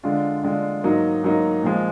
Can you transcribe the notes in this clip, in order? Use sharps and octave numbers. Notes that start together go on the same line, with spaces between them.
D3 G#3 D4 F4
D3 G#3 D4 F4
G#2 F#3 A#3 D#4
G#2 F#3 A#3 D#4
A#2 F3 G#3